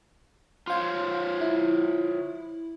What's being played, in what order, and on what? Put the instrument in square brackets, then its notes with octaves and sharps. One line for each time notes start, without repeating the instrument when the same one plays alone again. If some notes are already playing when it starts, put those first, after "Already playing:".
[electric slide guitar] F4 C5 C#5 [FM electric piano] F5 C6
[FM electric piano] E4